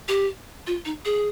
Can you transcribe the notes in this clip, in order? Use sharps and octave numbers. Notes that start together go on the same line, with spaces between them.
G4
F4
D#4
G#4